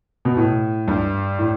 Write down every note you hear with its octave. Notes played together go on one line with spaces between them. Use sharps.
B2
A2
G2
A2